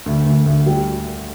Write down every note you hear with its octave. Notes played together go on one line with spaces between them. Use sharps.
D2
D2
D2
G3